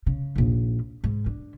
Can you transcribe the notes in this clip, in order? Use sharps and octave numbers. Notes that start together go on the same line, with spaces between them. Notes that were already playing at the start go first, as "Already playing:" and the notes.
C#3
A#1 D#2
G#2
D3